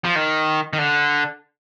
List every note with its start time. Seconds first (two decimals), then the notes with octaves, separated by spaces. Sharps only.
0.05 F3
0.15 D#3
0.73 D#3
0.78 D3